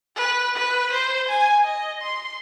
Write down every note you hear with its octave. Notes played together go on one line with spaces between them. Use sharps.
B4
B4
C5
G#5
D#5
C6